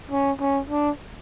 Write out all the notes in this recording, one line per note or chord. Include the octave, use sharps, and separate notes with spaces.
C#4
C#4
D4